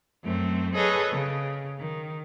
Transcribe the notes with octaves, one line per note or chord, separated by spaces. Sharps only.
F#2 A3 C4
G#4 A4 B4 C#5 D#5
C#3
D#3